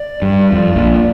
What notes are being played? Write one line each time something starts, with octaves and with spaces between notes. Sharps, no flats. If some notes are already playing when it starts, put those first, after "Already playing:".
Already playing: D5
G2
F2
A#1 A#2